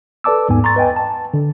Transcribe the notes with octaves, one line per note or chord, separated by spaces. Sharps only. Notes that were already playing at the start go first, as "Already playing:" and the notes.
A4 B4 D5 A5 D6 E6
D#2 G#2 B3 G#5
A#5 C6 C#6 A6
B4 D#5 G5 G#5
A5
D3